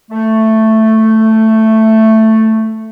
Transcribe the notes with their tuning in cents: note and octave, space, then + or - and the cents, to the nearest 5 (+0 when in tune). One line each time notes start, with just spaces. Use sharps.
A3 +5